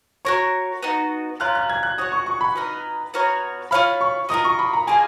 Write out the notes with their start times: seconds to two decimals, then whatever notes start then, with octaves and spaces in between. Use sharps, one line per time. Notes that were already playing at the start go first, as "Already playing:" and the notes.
0.25 F#4 A#4 C#5 C#6
0.83 B3 D#4 F#4
1.40 C#4 F4 A#4 F#6
1.55 F#6
1.70 G#6
1.83 F#6
1.98 F#4 C#5 F#5 D#6
2.12 C#6
2.26 C#6
2.41 B5
2.56 B3 D#4 A#4 D#5
3.14 B3 F#4 A#4 C#5
3.71 F4 A#4 C#5 F5 B5
4.01 C#6
4.29 F4 A#4 D#5 D#6
4.44 C#6
4.59 B5
4.73 A#5
4.87 A#3 F4 G#4 D#5 G#5